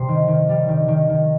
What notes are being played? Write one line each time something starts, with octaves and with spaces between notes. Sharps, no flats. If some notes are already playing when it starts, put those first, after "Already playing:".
Already playing: C3 G3 C6
D#3
D#3
G3
D#3
D#3
D#3